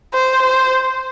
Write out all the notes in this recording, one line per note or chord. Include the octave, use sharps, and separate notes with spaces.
C5
C5